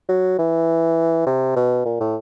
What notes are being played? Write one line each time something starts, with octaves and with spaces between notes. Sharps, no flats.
F#3
E3
C3
B2
A#2
A2